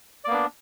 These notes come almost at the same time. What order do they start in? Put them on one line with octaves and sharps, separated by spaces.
D5 A#3 B3 D4